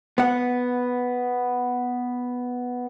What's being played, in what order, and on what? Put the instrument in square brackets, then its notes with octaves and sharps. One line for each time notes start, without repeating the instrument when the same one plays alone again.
[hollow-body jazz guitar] B3 F#5